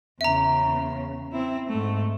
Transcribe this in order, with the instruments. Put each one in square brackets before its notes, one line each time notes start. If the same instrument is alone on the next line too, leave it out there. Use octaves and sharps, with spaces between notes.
[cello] E2 C#3 [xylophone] E5 A#5
[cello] C4 E4
G#2 A3